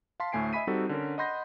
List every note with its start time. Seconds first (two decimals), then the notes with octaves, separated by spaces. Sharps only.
0.20 F5 A5 C6 B6
0.32 D2 A2 A3 G#5 C7 D7
0.53 D#5 E5 G#5 B5 B6 D#7
0.67 G3 C4 D#4 F#4 A4
0.89 D3 C#4 A#4
1.18 D#5 F#5 B5 C6 G6 A#6